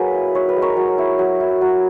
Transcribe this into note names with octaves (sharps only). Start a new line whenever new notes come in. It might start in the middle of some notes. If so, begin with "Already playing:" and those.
Already playing: F#3 A#3 G#4 B4
E4
D#4 C#5
B4
G#3
A#4 C#5
F#3
E4
F#3
E4
F#3